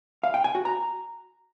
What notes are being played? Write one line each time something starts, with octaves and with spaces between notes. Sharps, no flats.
F5
G5
G#5
F#4
A#5